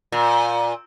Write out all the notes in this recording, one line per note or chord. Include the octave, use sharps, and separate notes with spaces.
A#2